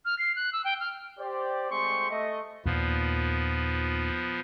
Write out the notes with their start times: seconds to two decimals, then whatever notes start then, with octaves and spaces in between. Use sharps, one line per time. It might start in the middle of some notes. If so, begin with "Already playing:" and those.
0.05 F6
0.19 C7
0.36 F#6
0.53 E6
0.64 G5
0.80 F6
1.19 G4 C5 D5
1.70 G#3 A3 C4 G4 C6 C#6
2.10 A3 D#5
2.65 D#2 A#2 F3 B3